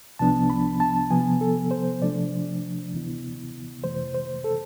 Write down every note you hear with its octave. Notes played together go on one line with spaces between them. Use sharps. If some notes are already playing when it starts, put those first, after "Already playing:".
C2 C3 F3 B3 D4 A5
B5
A5
C3 F3 B3 G#5
A4
C5
C3 F3 A3 D4 D5
D2 C3 E3 B3 E4
F2 C3 E3 A3 C5
C5
A4